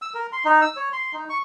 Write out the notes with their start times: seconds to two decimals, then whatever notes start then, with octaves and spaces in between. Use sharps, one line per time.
0.02 E6
0.14 A#4
0.33 C6
0.45 D#4
0.61 E6
0.77 C#5
0.93 C6
1.14 D#4
1.29 C#6